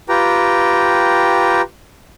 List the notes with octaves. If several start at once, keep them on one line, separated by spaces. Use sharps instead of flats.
F4 G4 B4 G5 A#5